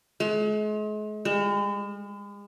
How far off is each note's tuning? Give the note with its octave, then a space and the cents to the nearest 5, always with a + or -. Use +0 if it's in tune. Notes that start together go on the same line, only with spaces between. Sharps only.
G#3 +40
G#3 -40